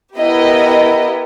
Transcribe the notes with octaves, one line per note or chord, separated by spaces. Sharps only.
B3 E4 G4 A#4 D#5